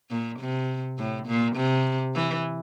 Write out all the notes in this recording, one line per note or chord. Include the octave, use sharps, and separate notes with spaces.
A#2
C3
A2
A#2
C3
E3